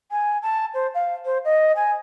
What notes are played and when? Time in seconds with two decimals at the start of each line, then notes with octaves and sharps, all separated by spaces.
0.11 G#5
0.42 A5
0.74 C5
0.94 F5
1.25 C5
1.45 D#5
1.76 G#5